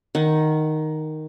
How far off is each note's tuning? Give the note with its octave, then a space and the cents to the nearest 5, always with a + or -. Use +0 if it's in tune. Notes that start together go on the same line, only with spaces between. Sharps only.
D#3 +0 F#5 +10